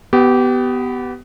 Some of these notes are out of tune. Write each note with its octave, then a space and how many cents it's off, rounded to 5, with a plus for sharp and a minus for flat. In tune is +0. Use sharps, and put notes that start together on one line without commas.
B3 +10 G4 -20